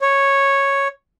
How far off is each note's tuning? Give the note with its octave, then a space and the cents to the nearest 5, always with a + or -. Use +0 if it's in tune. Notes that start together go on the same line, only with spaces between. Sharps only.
C#5 -5